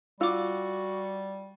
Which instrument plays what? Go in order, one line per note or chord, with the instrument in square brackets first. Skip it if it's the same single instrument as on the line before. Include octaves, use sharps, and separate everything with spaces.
[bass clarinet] G3 [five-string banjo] F4 [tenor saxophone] F#4 [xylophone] D6 E6